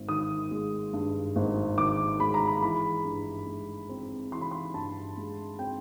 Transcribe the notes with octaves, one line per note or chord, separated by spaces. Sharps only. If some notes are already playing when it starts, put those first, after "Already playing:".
Already playing: G#1
D#3 D#6
G#3
G2
G#1
D#3 D6
G#3 B5
A#5
B5
E3 B5
G2
G#3
C4
E3 C6
B5
C6
G2 A5
G#3
C4 G5